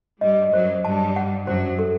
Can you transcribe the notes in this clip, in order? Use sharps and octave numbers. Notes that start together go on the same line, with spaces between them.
G2 G3 D#5
F#2 F#3 C5
G2 G3 A5
F#5
F#2 F#3 C5
A4